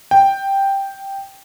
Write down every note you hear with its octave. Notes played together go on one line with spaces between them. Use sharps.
G5